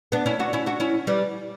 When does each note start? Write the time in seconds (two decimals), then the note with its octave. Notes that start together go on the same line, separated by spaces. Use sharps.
0.12 B3 D4
0.26 C#4 E4
0.39 D4 F#4
0.53 C#4 E4
0.66 D4 F#4
0.80 C#4 E4
1.07 G3 B3